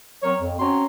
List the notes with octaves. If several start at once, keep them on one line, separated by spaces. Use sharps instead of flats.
F#3 C4 A#4 C#5
F2
C4 C#4 F#4 C#5 A#5 C6